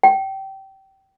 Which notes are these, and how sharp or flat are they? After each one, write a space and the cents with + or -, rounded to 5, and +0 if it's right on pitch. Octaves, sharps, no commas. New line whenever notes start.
G5 -20